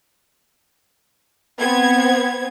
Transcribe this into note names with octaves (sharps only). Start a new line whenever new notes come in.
B3 C4 G#6